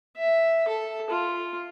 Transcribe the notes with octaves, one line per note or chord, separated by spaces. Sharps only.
E5
A4
F4